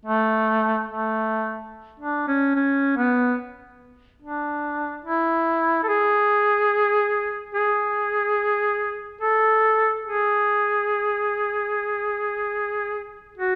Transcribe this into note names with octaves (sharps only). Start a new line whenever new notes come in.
A3
A3
D4
C#4
C#4
B3
D4
E4
A4
G#4
G#4
A4
G#4
F#4